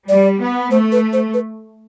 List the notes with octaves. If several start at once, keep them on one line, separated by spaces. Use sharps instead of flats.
G3 D5
B3
A3 C5
B4
C5
B4